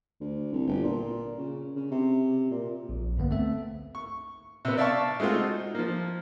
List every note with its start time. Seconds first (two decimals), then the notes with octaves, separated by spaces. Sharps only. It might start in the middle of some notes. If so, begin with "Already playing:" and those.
0.20 D2
0.52 C2
0.67 G1
0.83 A#2
1.38 C#3
1.76 C#3
1.91 C3
2.51 A#2
2.89 A#1
3.16 C#2 G2 D3 A#3 B3
3.31 A3 C4 A4 E5
3.95 C#6
4.65 C3 B3
4.77 D5 E5 F5 A5 C#6
5.20 G#3 A3 C4 F4 F#4
5.36 D#4
5.75 F3 A#3